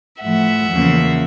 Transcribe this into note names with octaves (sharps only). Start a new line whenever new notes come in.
A2 F3 A3 E5 F#5
E2 C#3 F3 A#3